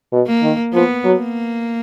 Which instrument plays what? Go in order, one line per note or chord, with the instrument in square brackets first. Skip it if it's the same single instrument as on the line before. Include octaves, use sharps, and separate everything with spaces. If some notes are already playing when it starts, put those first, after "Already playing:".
[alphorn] B2
[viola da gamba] A#3
[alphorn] D#3
[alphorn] F3 [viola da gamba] B3
[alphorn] F#3
[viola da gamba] A#3